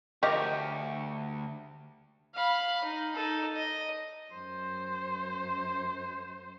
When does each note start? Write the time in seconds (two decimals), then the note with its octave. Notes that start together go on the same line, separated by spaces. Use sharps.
0.23 D2 F3 G4 A#4 C#5 D#5 C#6
2.35 F5 B5
2.84 D#4
3.15 D#4 A4
3.56 D#5
4.33 F#2 C5